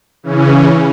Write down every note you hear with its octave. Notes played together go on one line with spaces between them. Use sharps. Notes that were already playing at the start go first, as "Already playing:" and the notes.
C#3 E3 C#4